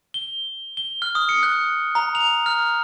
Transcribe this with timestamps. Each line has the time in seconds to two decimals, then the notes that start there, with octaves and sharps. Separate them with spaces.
0.14 G7
0.77 G7
1.02 F6
1.15 D#6
1.29 C#7
1.43 F#6
1.95 A#5
2.15 F7
2.46 F6